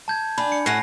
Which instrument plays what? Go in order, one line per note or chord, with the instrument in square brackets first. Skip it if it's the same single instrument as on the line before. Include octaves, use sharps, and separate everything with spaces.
[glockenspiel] A5 G6 G#6
[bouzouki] D4 [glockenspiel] G#5 B5
[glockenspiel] C#7
[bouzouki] A2 C#4 F#5 [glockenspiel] G#5 A#6 C7